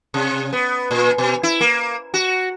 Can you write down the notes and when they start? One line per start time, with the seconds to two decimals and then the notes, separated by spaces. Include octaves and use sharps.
0.14 C3
0.53 B3
0.91 A#2
1.18 B2
1.43 E4
1.61 A#3
2.14 F#4